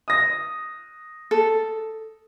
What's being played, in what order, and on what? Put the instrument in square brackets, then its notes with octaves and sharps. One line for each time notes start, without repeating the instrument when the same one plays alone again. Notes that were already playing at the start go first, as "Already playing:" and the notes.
[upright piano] D#6 A#6
[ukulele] A4